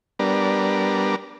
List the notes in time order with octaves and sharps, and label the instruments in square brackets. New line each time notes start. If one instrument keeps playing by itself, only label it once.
[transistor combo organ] G3 B3 D4 A#4